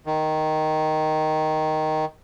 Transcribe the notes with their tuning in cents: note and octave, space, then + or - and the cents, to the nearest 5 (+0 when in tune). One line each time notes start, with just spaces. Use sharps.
D#3 +0